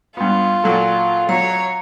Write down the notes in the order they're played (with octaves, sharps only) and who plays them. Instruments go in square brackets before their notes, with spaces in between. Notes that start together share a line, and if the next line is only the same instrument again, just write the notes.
[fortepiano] G2 B3 [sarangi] F4
[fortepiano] A#2 F#3 A4
[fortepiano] F#3 [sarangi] C#5 [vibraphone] A#5